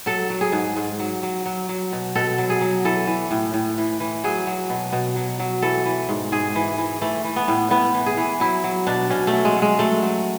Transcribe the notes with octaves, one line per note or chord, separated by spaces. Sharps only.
F#3 A4
F#3
G#4
G#2
G#2
F#3
F#3
F#3
F#3
B2
B2 A4
F#3
G#4
F#3
E3 A4
E3
A2
A2
E3
E3
F#3 G#4
F#3
B2
B2
F#3
F#3
E3 A4
E3
G#2
G#2 G#4
E3
E3
E3 A3
E3
B3
A2
A2 B3
E3
G#4
E3
F#3 E4
F#3
B2 D4
B2 C#4
A3
F#3
G#3
F#3
G#3
F#3 A3
F#3